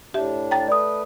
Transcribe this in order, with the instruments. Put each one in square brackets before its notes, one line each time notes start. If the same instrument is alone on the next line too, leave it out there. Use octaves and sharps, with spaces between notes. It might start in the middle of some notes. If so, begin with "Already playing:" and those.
[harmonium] A2 D4 [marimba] G4 E5
[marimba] G5 A#5 A6
[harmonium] A3 B4 [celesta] D5 D#6